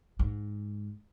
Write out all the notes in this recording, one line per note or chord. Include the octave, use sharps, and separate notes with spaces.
G#2